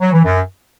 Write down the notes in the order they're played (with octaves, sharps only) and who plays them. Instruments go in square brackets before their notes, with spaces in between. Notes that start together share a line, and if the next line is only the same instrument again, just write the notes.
[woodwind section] F#3
E3
F#2